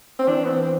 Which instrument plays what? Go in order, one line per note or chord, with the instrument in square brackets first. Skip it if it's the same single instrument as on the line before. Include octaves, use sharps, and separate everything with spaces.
[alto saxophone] C4
[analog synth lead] E3 [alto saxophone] D4
[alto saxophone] B3
C4
C4